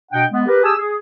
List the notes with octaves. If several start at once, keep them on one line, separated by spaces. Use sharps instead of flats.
B2 D4 D#5 F#5 G5
G#3 B3
G4 A#4 B4
G4 G#4 G#5 A5 D#6 E6
G#4